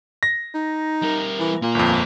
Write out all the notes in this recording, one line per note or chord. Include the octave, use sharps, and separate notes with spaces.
A#6
D#4
G3 A#4
E3
A#2 A#3 F5
G1 F2